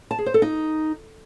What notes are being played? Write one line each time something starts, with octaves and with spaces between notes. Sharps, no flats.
A5
G#4
C5
A4
D#4